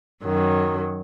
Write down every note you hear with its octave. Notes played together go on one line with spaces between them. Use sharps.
F#2 D#3 F#3